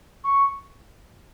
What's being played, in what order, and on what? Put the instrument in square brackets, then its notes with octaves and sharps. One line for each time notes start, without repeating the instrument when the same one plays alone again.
[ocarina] C#6